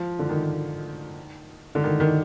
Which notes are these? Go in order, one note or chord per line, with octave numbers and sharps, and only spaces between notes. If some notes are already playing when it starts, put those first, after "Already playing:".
Already playing: F3
D3
D#3
D3
D#3
D#3